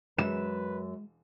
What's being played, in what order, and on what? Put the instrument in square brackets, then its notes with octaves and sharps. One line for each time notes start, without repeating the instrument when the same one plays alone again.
[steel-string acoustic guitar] F#2 [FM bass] G#3 [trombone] B4 [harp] E7